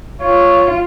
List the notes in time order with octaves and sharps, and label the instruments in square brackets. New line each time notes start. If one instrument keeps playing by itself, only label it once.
[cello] F4 [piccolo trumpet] C#5